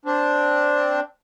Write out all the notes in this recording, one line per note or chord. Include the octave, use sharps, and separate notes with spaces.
C4 D4